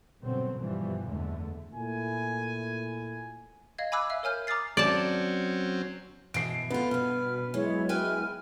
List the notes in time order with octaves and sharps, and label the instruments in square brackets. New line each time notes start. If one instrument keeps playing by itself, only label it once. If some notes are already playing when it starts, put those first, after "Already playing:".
[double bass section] G2 B2 D3 F#3 C4
G2 B2 E3 F3 G3
F#1 E2 D3 G#3 A3
[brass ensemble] A#2 A3 E4 G#5
[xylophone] D#5 F5 G#6
G#5 B5 D6 E6 F#6 G#6
E5 F5 E6
A#4 C#5 G#5 F6 G6
A#5 D6 D#6 F6 A6 C7
[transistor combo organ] F#3 C4 C#4 [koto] D5 A5
[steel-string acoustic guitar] B2 E3 [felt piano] C7 D7
[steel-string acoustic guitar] D3 F4 [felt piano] B3
[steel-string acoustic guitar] G2 B4 [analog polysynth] B2 [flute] F6
[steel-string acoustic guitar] E3 [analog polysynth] F#3 G#3 E4 [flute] C#5
[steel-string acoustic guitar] B4 G5 G#5 [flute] F6